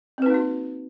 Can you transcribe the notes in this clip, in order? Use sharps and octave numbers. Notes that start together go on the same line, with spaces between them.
A#3 C4 D#4 F#4 B4